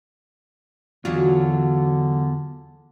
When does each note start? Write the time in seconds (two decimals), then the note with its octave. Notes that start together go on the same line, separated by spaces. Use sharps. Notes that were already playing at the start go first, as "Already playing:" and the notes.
1.05 E2 D3 F#3 D4 F4 F#4